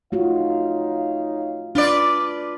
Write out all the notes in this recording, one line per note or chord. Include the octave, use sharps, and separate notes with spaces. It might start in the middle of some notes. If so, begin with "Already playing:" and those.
A3 D#4 F4 F#4 C#5 F5
D4 F4 B4 D5